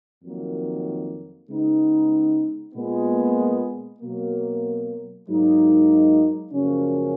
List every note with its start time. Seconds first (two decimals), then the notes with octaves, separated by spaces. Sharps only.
0.22 F2 D#3 F#3 A#3
1.49 C#3 G#3 B3 D#4
2.75 A#2 G#3 B3
4.00 B2 F#3 A#3
5.27 G#2 F#3 A#3 D#4
6.53 F#2 C#3 F3 A#3 C#4